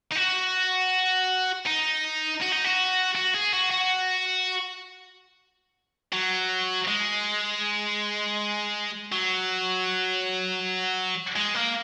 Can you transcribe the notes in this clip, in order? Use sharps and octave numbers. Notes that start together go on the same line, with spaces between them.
D#4
F#4
D#4
F#4
D#4
F#4
F#4
G#4
F#4
F#4
F#3
G#3
F#3
G#3
A#3